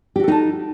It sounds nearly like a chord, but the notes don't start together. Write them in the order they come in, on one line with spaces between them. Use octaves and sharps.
G4 F#4 A4 D#4 A5